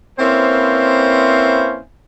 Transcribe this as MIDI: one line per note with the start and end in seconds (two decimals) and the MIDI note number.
0.19 1.78 58
0.19 1.78 60
0.19 1.78 61
0.19 1.78 64
0.19 1.78 71
0.19 1.78 72